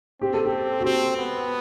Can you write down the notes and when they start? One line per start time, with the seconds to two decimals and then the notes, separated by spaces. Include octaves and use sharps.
0.21 C4 G4
0.34 A4
0.45 G4
0.81 F#4
0.85 C4 G4
1.16 B3